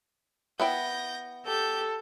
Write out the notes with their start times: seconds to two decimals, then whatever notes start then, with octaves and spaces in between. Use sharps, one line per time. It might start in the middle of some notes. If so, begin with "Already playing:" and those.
0.60 B3 E4 G5 G6 A#6
1.47 G4 A4 G6